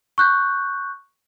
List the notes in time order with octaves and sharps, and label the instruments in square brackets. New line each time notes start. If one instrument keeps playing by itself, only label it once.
[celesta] C#6 F#6 G6